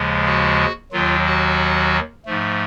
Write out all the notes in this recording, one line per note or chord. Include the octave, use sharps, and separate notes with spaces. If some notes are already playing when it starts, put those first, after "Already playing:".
Already playing: D#2 C#3 F3 G#3
F#4
D#2 D#3 F#3 F4
F#4
G#2 F3 A3